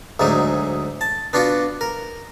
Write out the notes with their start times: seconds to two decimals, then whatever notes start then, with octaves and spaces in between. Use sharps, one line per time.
0.20 D2 G#2 F#3 G#3
1.01 A5
1.33 B3 D4 F4 F#4
1.81 A#4